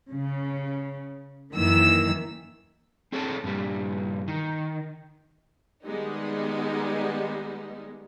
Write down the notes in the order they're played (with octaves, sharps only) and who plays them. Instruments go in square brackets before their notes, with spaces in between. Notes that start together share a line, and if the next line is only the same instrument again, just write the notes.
[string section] C#3
F#2 D#3 E3 A#3 E6
[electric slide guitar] C4 G#4 A4 C#5 A5
G2 A#2 G3
D#3
[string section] D#3 G3 G#3 B3 D#4